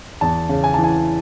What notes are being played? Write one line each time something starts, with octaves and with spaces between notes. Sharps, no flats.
E2 A5
C#3
G#5
E3 A5
G#5